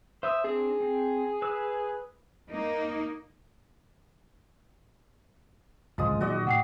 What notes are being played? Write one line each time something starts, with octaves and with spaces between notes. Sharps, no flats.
C5 E5 D#6 E6
C4 D4 G#4
C4
B4 D#6 E6
A#3 D#4
D1 G#1 C#2 F3 G#3 D#6
A#2 D#3 F#3 F#4 D5 D#5
A2 F#5 G5 C7